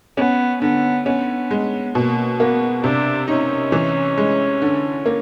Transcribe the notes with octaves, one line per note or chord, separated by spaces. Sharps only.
B3 C#4
D3 B3
B3 C#4
G#3
B2 A#3
A#3 B3
C3 D4
C#4 D#4
E3
G#3
D3
A#3